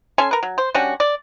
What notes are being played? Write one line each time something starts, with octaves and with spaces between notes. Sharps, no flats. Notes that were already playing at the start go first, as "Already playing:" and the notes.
C#4 A4 G#5 C6
A#4 B4
F#3
C5
G3 C#4 D4 F#4
D5